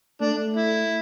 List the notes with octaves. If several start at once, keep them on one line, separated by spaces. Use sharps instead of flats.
A3 D4
E4